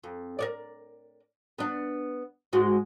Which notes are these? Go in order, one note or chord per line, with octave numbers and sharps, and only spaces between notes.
F2
A#4 C#5 D5
B3 D4
G#2 G#3 F#4